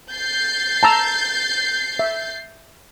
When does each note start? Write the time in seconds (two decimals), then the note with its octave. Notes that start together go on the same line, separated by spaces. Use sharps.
0.11 G6 A6 C7
0.83 A5 A#5 E6
1.99 E5